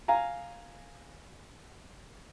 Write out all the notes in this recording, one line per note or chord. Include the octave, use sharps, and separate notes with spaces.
F5 G#5 A#5